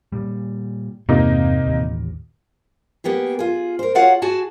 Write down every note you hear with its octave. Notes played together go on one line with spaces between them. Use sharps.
A#2 G3
E2 G2 C3 A#3 C4 D#4
A1 D#2
A#3 B3 G4 G#4
F4 G#4
A#4 C5
F4 F#4 G#4 C#5 F5 F#5
F#4 G#4 G#5 A5